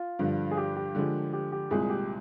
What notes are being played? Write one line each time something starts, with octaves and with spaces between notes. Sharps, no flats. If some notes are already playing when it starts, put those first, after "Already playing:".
Already playing: F4
G2 D3 F3
G#4
G4
G4
D3 F3 G#3
G4
G4
C2 A#2 G#3 G#4
G4